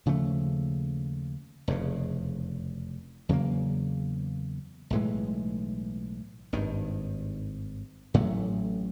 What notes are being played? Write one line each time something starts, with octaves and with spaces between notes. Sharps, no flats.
D#2 C#3 F3 A3
F1 E2 C#3
E2 C#3 F#3 A#3
B1 A2 E3 G#3
G#1 G2 D#3
A1 A2 F#3 A3